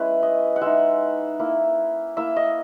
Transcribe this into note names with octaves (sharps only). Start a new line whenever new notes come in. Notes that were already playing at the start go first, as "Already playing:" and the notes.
Already playing: G#3 C#4 E4 G#4 B4
D#5
F#5
G#3 D#4 E5
A#3 E4
A#3 E4 E5
D#5